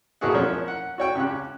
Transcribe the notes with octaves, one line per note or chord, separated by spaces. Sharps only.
B1 A#3 E4 F#4 G#4 F#5
F3 A#3 C#4 C#5
F#5
F#4 C#5 G5
C#2 C#4 G4 F#6